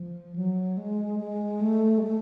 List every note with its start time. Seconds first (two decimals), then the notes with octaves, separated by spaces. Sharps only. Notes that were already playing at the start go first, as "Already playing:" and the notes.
Already playing: F3
0.36 F#3
0.77 G#3
1.20 G#3
1.61 A3
1.98 G#3
2.03 A3